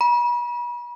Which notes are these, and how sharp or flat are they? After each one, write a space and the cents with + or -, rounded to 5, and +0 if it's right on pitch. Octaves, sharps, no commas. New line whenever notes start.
B5 -40